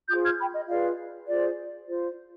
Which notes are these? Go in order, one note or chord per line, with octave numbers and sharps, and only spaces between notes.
F4 G#4 C5 D#6 G6
F6 G#6
G5 B5
D#5
F4 G#4 B4 D5 F5
F4 G#4 C5 D5
F4 C5